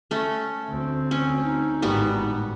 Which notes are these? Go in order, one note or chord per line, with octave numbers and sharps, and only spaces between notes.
A3 C#4
D2 C4
C#4
D#4
G#1 A2 G3 B3 F#4